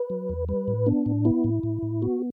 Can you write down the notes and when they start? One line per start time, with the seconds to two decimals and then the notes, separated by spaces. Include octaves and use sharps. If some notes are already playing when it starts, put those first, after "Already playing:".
Already playing: B4
0.10 F#3
0.29 E2
0.49 G3 B4
0.68 A2
0.86 B3 D4
1.06 A2
1.25 B3 E4
1.44 A2
1.63 A2
1.83 A2
2.02 B3 F#4